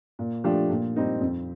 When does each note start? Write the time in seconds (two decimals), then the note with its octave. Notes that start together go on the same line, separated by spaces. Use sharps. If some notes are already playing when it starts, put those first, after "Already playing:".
0.19 A#2
0.44 F3 A3 D4 G4
0.70 A#2
0.96 G3 C4 D#4
1.21 F2